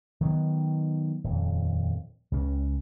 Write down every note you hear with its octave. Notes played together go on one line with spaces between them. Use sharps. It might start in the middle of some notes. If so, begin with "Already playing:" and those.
D#3 F#3 A#3 B3
D#1 F2
C#2 C#3 C#4